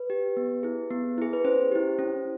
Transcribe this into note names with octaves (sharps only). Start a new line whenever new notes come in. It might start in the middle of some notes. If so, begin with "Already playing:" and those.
Already playing: B4
G4
B3
E4 G#4
B3
E4 G#4
B4
C#4 C5
E4 G4
C#4